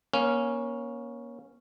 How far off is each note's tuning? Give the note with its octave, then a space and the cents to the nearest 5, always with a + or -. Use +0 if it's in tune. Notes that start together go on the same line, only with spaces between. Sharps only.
A#3 +30 C#4 +0